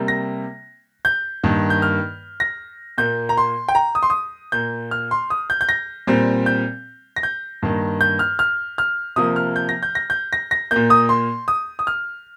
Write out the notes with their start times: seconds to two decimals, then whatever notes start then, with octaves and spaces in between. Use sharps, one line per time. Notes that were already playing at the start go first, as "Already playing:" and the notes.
Already playing: C3 G3 A#3
0.08 A#6
1.05 G6
1.43 G2 D#3 A#3
1.70 G6
1.82 F6
2.40 A#6
2.98 A#2 A#3 G6
3.29 A#5
3.37 C6
3.69 G5
3.75 A#5
3.95 D#6
4.03 C6
4.10 D#6
4.52 A#2 A#3 G6
4.91 F6
5.11 C6
5.30 D#6
5.50 G6
5.61 G6
5.69 A#6
6.07 A#2 G3 C4
6.46 G6
7.16 A#6
7.23 G6
7.62 G2 D#3 A#3
8.01 G6
8.19 F6
8.39 F6
8.78 F6
9.16 C3 F3 A#3 D#6
9.36 F6
9.56 G6
9.69 A#6
9.83 G6
9.95 A#6
10.10 G6
10.33 A#6
10.51 A#6
10.71 A#2 A#3 G6
10.90 D#6
11.09 C6
11.48 D#6
11.79 D#6
11.87 F6